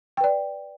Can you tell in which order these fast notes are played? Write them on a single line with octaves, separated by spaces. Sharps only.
G5 B4 D5